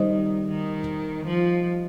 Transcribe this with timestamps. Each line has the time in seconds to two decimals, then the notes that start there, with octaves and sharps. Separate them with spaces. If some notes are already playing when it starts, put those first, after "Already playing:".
Already playing: D#3 G3 D#4 C5 D#5
0.49 D#3
1.26 F3